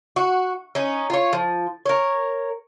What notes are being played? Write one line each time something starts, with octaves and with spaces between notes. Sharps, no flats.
F#4
C#4 D#4
F4 C#5
F3
A#4 C#5